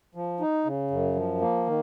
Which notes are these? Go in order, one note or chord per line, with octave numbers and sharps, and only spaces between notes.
F3
D#4
C#3
F#2
F3
A#3
D#3